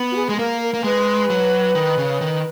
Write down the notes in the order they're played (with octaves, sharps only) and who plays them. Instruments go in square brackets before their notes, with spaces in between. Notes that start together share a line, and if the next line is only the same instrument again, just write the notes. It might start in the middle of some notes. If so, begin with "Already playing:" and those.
Already playing: [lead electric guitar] B3
[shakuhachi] F#4
G#4
[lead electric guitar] G#3 [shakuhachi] G#4
[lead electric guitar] A#3 [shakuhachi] A#4
[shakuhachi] A#4
[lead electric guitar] A#3
[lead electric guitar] G#3 [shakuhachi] B4
[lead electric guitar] F#3
D#3
C#3
D#3